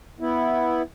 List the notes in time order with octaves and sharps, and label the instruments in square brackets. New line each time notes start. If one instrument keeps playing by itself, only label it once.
[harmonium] B3 E4